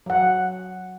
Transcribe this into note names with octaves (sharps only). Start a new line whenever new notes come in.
F#3 F#5